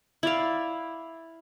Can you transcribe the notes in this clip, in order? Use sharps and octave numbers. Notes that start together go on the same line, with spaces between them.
E4 D5 F5